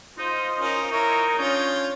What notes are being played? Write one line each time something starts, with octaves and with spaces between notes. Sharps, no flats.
D#4 F4 C5 D#5
C#4 D#4 A#4
E4 A#4 C#5
C#4 D4 F4 C#5 G6